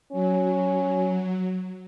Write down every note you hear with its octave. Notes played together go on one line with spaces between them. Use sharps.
F#3 C#4